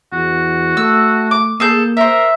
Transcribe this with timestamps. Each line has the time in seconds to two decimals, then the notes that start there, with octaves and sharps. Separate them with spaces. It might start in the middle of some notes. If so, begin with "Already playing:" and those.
0.12 E2 F#4
0.77 A3 E6
1.31 D6
1.60 A#3 G#4 A4 G6
1.97 A#4 C5 E5